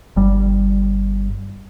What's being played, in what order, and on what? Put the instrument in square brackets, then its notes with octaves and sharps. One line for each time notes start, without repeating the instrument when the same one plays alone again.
[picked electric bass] G1 G3